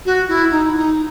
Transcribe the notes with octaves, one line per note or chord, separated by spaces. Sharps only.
F#4
E4
D#4
E4
D#4